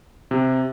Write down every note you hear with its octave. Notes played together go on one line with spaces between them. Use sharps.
C3